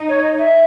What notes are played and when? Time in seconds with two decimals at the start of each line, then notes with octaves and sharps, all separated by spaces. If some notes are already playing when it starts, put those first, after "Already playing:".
Already playing: D#4
0.09 C#5
0.23 D#5
0.38 E5